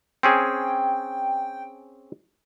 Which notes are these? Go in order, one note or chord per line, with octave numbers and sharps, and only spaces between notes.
C4 C#4 G#4 G5